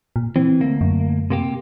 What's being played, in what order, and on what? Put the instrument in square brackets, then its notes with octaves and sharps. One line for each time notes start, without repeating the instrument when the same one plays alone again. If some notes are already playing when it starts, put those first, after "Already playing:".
[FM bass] A#2
[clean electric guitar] E3 [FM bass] C4
[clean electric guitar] D2 A#3
[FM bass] F#2
[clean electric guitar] C3 A#3 G4